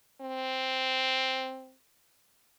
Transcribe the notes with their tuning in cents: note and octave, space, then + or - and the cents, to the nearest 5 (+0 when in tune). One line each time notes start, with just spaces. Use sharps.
C4 +0